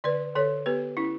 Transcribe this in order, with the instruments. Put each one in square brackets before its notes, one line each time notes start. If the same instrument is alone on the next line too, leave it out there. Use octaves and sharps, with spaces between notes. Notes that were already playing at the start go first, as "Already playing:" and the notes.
[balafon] D3 B4 D5
D3 A4 C#5
B3 G4 B4
C#4 E4